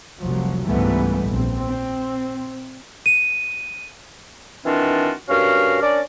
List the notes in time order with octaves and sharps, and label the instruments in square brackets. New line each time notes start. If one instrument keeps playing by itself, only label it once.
[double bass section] F1 C2 F3 F#3
C#2 G#2 E3 G3 A3 B3
A#1 C4
C4
[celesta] D#7
[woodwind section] D#3 E3 C4 D4 F4 F#4
G2 C#4 F#4 A#4 F5
C#4 D4 A#4 D5